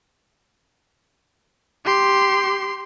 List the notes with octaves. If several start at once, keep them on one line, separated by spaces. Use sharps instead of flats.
G4 C6